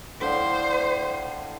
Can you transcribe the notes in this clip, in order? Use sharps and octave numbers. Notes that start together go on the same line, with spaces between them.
A2 D3 C5 F5